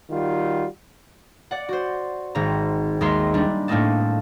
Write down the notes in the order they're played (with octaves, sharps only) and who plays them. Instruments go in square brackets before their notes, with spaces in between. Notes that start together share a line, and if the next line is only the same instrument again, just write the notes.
[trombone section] D#3 G3 F4 F#4
[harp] D5 F#5
F#4 C5
G#1 C4 A#5
D#2 G#3 E5 A#5 C6 C7
G3 D4
A2 A3 A#3 C4 D#4 A5